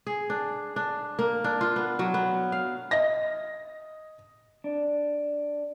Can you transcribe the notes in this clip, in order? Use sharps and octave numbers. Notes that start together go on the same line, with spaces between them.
G#4
D4
D4
A#3
D4
F4
B3
F#3
B3
F5
D#5 A#6
D4